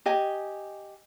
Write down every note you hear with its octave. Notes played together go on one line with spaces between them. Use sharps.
G4 D#5 G#5